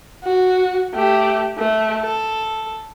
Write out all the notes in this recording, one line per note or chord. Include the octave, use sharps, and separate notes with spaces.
F#4
A3 G4
A3
A4